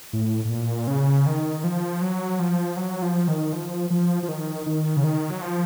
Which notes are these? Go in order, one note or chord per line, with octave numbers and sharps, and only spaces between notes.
A2
A2
A#2
C#3
D#3
F3
F#3
F3
F#3
F3
D#3
F3
F3
F3
D#3
D#3
C#3
D#3
F#3
F3